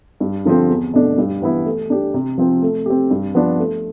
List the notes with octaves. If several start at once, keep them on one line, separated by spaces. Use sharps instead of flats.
G2
D3 F3 C4
E2
B2 A3 D4
G2
E3 B3 E4
A3
D4 G4
C3
F3 C4
A3
C4 G4
G2
F3 B3 D4
A3